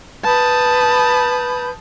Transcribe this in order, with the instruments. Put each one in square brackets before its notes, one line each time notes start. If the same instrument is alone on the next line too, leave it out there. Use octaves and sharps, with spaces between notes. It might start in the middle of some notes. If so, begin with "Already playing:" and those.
[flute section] B4 B5 G6 [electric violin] A5 D#6